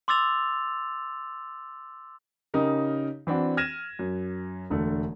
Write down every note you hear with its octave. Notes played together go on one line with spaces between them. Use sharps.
C6 D6 E6 A6 F7
C#3 C#4 D#4 G4 A#4
E3 C4 D4 F#4
F6 G#6 A#6 D#7 E7
F#2
E1 D3 A3